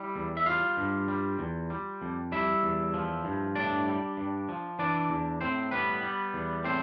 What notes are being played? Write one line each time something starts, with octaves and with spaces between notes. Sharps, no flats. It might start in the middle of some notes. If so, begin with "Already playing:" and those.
Already playing: G3 E4
E2
E5
G3 F4 F5
G2
G3
E2
G3
F2
G3 E4 E5
E2
F3
G2
A2 D4 D5
G3
G2
F3
E3 D4 D5
E2
A2 C4 C5
G3 B3 B4
G3
E2
A2 C4 C5